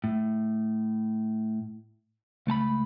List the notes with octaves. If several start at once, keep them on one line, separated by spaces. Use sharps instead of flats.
A2
C#2 A3 A5 B5